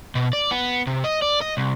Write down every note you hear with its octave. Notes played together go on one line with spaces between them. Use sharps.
B2
D5
B3
C3
D#5
D5
D#5
C2